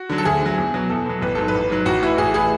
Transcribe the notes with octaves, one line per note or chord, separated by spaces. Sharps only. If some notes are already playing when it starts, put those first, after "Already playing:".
Already playing: F#4
D3 F#3
A4
D2 G#4
D3 F#3
E2
B2 F#3
E2 A4
B2 F#3
A1 B4
G#2 F#3 A4
B4
A1
G#2 F#3
A1 F#4
A2 E3
A1 G#4
A2 E3 G#4